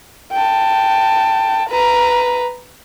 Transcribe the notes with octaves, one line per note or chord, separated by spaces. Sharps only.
G5 A5
B4 A#5